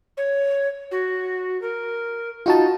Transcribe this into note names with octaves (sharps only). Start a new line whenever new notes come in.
C#5
F#4
A#4
D#4 F4 F#4 A5